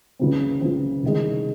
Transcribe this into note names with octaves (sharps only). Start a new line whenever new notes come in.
C#2 C#3 E3 C4
C#2 C#3 E3 C4
C2 C3 D#3 G#3